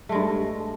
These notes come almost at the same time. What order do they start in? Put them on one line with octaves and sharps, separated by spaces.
A3 G#3 G2